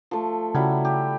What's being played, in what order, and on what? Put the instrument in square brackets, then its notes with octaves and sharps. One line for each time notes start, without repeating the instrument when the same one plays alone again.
[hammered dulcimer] F3 A3
[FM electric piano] C#3 [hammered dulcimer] F#3 G3 E4
[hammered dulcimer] G4